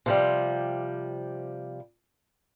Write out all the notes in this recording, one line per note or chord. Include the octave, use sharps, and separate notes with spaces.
C3 F3 G3